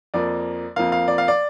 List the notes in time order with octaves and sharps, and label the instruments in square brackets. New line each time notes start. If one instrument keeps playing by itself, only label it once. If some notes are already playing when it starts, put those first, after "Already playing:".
[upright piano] F2 F3 A#3 D5
F2 F3 A#3 F5
F5
D5
F5
D5